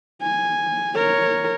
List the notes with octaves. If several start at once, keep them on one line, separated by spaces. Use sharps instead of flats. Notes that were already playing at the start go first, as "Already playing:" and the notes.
G#5
A#4 C#5